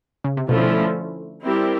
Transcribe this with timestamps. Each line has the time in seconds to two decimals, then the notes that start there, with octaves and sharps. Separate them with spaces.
0.24 C#3
0.37 C3
0.49 B2 D3 F3 A3 C#4 E4
1.44 G3 C4 E4 G4 A#4